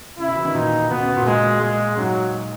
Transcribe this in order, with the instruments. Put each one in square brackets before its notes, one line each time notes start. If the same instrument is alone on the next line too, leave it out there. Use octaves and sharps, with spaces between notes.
[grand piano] C#3 [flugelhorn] E4
[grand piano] B2
E3
D#3
[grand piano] A#2 [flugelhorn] D#4
[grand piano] B2 [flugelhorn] B3
[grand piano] C#3
B2
A#2
[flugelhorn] G#3
G#3
[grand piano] G#2 [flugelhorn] F#3